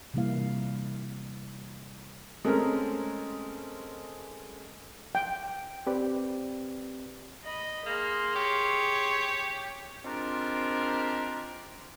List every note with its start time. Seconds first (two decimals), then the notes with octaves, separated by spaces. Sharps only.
0.14 C3 E3 G3 A#3 E4 F5
2.45 G#3 A3 C4 C#4 A#4
5.15 G5
5.87 C4 G4 B4 D5
7.44 D#5 B5
7.86 A#3 G#4 C6
8.36 G4 C#5
10.05 G#3 C4 D4 F4 G4 A#4